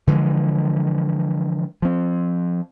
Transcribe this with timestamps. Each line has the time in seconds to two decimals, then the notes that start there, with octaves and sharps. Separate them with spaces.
0.07 D3 E3 F3 G#3
1.82 F3 C4